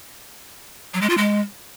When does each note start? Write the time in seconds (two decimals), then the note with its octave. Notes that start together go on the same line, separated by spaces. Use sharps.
0.94 F#3
1.02 G#3
1.10 F4
1.17 G#3